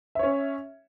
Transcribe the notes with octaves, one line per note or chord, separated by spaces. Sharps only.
C#4 C#5 E5